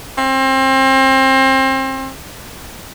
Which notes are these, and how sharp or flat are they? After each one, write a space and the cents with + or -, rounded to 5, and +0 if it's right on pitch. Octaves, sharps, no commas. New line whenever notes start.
C4 +30